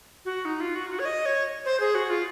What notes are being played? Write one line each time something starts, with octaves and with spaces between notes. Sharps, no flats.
F#4
D#4
F4
F#4
F#4
C#5
D#5
C#5
C5
G#4
F#4
F4